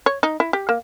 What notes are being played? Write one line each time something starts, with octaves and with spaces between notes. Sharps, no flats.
C#5
D#4
E4
G4
A#3